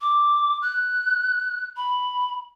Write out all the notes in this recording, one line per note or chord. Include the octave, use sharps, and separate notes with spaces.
D6
F#6
B5